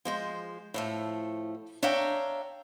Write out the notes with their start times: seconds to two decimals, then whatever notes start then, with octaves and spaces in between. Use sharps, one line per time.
0.05 F3 G#3 C5
0.74 A2 F3 A3
1.83 D4 C#5 E5 F5 G5 A#5